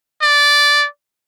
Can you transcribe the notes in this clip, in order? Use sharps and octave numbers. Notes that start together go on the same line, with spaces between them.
D5